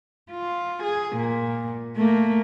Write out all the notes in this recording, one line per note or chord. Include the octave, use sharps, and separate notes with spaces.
F4
G#4
A#2
A3 A#3